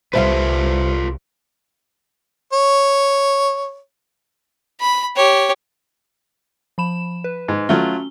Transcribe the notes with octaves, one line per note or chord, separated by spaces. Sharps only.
C2 F4 A4 B4 C5 E5 F5
C#5
B5
G4 C#5
F3 B5 E7
B4
G#2
F#3 A3 C#4 F4 G7